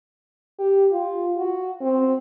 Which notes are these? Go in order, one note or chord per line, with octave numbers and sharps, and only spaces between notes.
G4
F4
F#4
C4